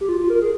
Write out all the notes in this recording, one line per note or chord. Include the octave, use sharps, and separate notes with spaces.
G4
F4
F4
A#4
G#4